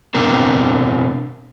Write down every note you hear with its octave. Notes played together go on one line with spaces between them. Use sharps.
B2 C4 D4 A#4